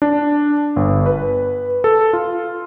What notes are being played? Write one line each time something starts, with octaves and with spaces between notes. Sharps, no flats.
D4
G1
B4
A4
F4